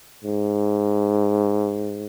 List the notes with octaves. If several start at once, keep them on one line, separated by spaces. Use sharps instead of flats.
G#2